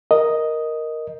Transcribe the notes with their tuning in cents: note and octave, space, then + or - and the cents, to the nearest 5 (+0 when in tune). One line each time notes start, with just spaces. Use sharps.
A#4 +0 D#5 +0